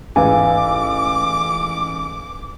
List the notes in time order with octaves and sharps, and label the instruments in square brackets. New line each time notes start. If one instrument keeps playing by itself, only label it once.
[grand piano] A1 G#2 [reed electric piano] B4 F5 G#5 [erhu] D6